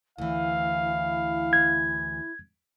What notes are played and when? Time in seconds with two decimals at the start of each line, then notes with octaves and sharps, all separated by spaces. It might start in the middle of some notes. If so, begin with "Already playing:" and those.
0.18 D2 E3 E4 F5
1.53 G#6